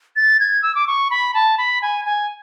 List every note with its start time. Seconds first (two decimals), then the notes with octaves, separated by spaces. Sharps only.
0.16 A6
0.40 G#6
0.62 E6
0.75 D6
0.87 C#6
1.11 B5
1.34 A5
1.58 B5
1.82 G#5
2.05 G#5